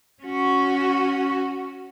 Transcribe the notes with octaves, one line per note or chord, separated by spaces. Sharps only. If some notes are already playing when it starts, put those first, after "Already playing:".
C#4 F#4